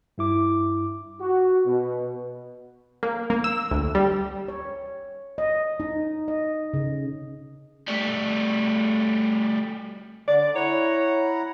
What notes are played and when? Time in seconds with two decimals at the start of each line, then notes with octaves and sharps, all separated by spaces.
0.18 G2 E4 D6
1.20 F#4
1.65 B2
3.03 A#3
3.30 A#3
3.44 E6
3.71 D2
3.95 G3
4.48 C#5
5.38 D#5
5.80 D#4
6.28 D#5
6.74 C#3
7.88 G3 A3
10.28 D3 D5
10.55 E4 C#5 F#5 A#5